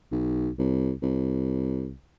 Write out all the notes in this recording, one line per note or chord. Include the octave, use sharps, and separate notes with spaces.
B1
C2
C2